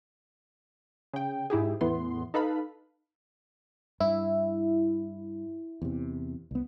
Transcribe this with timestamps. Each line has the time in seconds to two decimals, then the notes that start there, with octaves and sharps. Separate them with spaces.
1.14 C#3 G5
1.50 G#2 E4 G4 G#4
1.81 E2 A2 E3 B3 C6
2.34 D#4 A4 B4 F5 B5
4.00 G2 E4
5.82 E2 C3
6.51 C2 B3